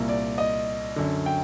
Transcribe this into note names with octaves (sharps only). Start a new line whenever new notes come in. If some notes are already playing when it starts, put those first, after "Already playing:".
Already playing: C2 A#2
D5
D#5
F#2 D3
G5